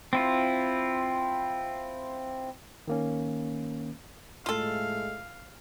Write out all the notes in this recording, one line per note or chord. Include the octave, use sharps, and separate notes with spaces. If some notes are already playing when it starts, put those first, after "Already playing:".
C4 E4 F4
D#3 A#3 C#4
A2 G#3 A3 F4 A4 F5